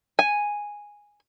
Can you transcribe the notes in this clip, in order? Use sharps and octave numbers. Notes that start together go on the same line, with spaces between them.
G#5